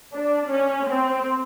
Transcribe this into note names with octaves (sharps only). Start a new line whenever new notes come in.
D4
C#4
C4